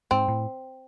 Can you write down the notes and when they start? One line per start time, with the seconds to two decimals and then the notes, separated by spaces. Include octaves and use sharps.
0.11 G#2 C4
0.28 A2